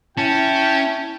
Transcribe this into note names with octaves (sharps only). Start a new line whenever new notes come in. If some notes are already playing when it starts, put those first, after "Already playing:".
C#4 E4 G5 A5